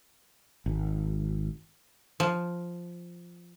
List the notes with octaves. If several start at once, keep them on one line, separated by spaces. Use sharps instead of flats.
G#1
F3